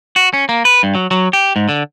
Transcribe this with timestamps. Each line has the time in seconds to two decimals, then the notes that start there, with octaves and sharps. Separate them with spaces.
0.16 F#4
0.33 C#4
0.49 A#3
0.65 B4
0.83 G2
0.95 F#3
1.11 F#3
1.33 G4
1.56 G#2
1.69 D3